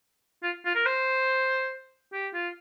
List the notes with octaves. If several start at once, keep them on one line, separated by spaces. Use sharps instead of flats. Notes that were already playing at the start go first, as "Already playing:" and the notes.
F4
F4
A#4
C5
G4
F4